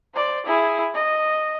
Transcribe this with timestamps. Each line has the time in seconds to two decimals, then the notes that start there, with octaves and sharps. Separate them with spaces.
0.14 C5 D5
0.45 E4 G#4
0.94 D#5